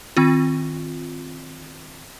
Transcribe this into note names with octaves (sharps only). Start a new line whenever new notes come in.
D#3 C4 F4